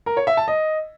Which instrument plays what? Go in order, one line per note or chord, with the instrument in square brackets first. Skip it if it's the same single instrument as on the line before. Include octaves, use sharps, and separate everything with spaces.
[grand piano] A#4
C#5
E5
A5
D#5